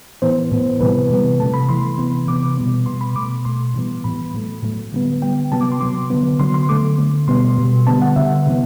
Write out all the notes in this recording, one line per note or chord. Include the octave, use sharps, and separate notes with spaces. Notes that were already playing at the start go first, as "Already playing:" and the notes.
A2 E3 B3 C5
A2 E3 B3
C3 E3 G3 B3 B4
C3 E3 G3 B3
C3 E3 A3 A5
B5
C3 E3 A3 C6
C3 E3 B3
C3 E3 B3 D6
B2 G3 B3
B2 G3 B3 C6
B5
B2 A3 D6
B2 A3 C6
A2 E3 G3 B3
A2 E3 G3 B3 B5
A2 F#3 A3
A2 F#3 A3
D3 G3 B3
D3 G3 B3 G5
C3 F#3 B3 A5
D6
C6
C3 F#3 B3 D6
D3 F#3 B3
D3 F#3 B3 C6
C6
D3 A3 D6
D3 A3
B2 G3 B3 C6
B2 G3 B3
D3 G3 B3 A5
F#5
D3 G3 B3 E5
C3 E3 B3